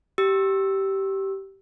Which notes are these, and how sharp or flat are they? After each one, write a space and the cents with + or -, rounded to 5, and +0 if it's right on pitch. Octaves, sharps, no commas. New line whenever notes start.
G4 -15 E6 +0